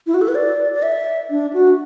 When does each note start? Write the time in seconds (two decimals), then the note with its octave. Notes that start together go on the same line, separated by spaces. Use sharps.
0.07 E4
0.14 F#4
0.21 A4
0.28 B4
0.35 D5
0.74 D5
0.83 E5
1.30 D4
1.53 F#4